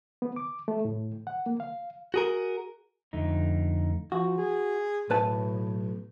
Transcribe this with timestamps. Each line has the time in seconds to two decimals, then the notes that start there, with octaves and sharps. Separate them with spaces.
0.22 B3
0.36 D6
0.68 A3
0.85 A2
1.27 F#5
1.46 A#3
1.60 F5
2.14 F#4 G#4 A#4
3.13 F2 D3 A3 D#4
4.12 F3 F#4
4.37 G#4
5.10 B1 A2 B4 A5